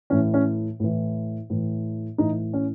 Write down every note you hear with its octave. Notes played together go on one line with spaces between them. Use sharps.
A2 E3 C#4
C#4
A2 E3
A2 E3
A2 E3 D#4
C#4